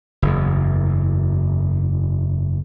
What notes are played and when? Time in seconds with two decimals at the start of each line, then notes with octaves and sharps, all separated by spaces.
0.22 F#1 E2